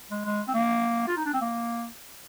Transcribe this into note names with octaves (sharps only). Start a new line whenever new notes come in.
G#3
G#3
C4
A#3
F4
D#4
D4
C4
A#3